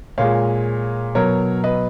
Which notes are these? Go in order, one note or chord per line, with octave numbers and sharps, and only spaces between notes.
A#2 G#3 C#5 F5
B2 F#3 A#4 C#5
B4 D#5